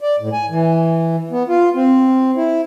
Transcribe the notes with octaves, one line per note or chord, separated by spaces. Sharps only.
D5
A2
G#5
E3
B3
F4
C4
E4